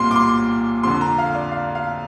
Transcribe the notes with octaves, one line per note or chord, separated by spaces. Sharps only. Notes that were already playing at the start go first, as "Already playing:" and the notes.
Already playing: C2 A#2 C6
D6
C6
F2 D3 C6
A#5
F5
D5
F5
F5